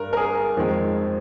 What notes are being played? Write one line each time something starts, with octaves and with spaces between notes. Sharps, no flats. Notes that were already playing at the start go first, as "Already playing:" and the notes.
Already playing: G2 A#4
A#4
G#4
F2 D#3 G#3